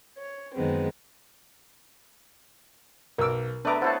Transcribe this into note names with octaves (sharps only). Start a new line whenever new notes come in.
C#5
F#2 D#3 G#3 B3 C4
B1 A#4 D6 E6
A3 B3 D4 B4 E5 A#5 D6
E4 C5 C#5 F#5 A5